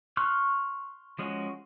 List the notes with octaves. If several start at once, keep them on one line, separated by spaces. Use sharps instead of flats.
C6 C#6 F6 F#6
F3 G#3 C#4 F#4